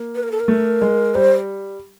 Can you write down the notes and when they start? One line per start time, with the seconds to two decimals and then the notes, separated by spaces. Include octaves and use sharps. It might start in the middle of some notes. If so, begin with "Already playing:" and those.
Already playing: A#3
0.15 B4
0.23 A#4
0.32 A4
0.40 A#4
0.48 A3
0.82 G#3
1.15 G3 C5